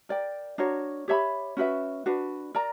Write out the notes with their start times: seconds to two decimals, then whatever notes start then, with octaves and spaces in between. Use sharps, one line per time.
0.09 A#4 D5 G5
0.58 D4 F#4 A#4 C#5
1.08 G4 C#5 E5 B5
1.57 C#4 F#4 B4 E5
2.06 D4 F#4 B4
2.55 A#4 D5 A#5